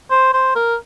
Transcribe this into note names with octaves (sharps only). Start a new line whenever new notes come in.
C5
C5
A#4